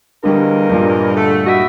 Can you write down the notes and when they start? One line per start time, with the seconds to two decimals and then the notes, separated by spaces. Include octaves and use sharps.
0.24 E2 D3 G3 A#3 A#4 D#5
0.70 G2 A#2
1.16 D3 A3
1.46 E4 F#4 D#5 E5